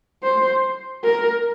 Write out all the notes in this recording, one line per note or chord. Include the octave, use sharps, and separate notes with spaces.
C5
A#4